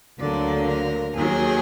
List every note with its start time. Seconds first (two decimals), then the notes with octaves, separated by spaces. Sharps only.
0.19 D2 D3 F#3 A#3 D5
0.68 A#4
1.16 D#2 D#3 F#3 G#4